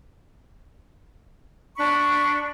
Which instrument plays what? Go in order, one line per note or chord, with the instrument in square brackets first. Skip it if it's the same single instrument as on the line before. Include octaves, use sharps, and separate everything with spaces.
[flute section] D4 B5 C#6